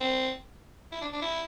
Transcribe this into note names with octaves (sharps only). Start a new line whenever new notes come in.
C4
E4
D4
D4
E4